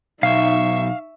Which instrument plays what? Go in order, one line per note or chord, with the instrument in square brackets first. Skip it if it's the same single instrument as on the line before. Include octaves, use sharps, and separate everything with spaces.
[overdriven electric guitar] B1 [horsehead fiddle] D#4 [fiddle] E5 C#6 [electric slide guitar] F5